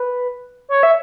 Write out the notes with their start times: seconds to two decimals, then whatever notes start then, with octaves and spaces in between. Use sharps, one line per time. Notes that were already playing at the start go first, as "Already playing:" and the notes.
Already playing: B4
0.69 C#5
0.83 E5